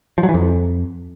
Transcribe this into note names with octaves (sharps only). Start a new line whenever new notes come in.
F3
F#3
E3
F2